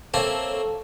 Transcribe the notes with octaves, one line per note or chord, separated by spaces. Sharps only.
A#3 C4 A4 C#5 E5